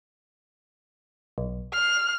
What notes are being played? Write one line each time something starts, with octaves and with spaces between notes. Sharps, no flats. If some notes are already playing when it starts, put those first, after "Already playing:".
B1
F6 C7